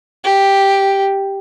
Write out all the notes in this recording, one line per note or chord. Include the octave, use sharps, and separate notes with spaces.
G4